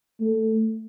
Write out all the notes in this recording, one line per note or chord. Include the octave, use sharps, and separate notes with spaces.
A3